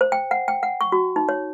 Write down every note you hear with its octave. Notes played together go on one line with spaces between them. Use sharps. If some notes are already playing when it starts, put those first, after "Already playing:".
C5
G5
F#5
G5
F#5
C#6
F#4
D#4
C#5